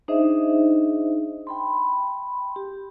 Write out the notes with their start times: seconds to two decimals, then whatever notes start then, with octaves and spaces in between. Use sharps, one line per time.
0.08 D4 D#4 G#4 C5 D#5 E5
1.47 G5 B5 C6
2.56 G4